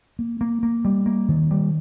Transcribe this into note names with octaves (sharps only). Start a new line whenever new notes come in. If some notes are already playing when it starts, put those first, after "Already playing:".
A#3
A#3
A#3
G3
A#3
D#3
G3